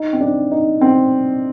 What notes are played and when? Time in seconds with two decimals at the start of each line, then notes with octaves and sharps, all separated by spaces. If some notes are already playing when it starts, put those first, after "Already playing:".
Already playing: D#4
0.13 C4
0.20 D4
0.51 D#4
0.81 C4